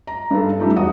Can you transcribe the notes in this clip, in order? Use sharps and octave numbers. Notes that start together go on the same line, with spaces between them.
A#5
G2 A4
F#2 G3 A3 D#4
E2 F#4 D#6